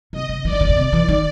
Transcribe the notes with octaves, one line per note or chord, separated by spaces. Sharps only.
C3 D#5
C#3
E3 D5
D#3
D3
C#3
C3 D5
E3
D#3